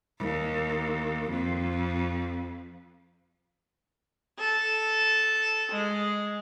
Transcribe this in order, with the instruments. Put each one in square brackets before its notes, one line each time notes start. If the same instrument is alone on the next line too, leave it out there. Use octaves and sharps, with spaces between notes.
[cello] D#2
F2
[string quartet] A4
G#3